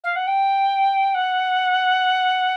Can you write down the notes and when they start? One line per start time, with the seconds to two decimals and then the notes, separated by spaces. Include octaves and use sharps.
0.04 F5
0.16 F#5
0.27 G5
1.14 F#5